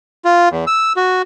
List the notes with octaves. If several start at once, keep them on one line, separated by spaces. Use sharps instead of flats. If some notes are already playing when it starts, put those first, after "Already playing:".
F4
E2
E6
F#4